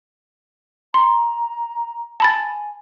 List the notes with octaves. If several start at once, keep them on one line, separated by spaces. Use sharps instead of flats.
A#5 C6
G#5 A5 B5 A6